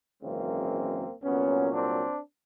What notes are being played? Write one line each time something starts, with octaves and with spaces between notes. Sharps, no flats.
G#1 F#2 C#3 E3 G#3 A#3 C4
C2 A#2 F#3 B3 C#4
C4 D4